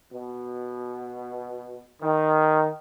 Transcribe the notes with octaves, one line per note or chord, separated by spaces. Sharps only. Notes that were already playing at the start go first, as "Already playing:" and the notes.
B2
D#3